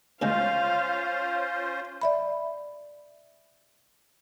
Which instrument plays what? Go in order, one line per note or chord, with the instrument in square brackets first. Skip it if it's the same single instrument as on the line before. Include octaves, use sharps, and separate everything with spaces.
[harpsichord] D2 C#3 G#3 [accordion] C#4 F4 C5 [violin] F5
[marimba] D5 E5 B5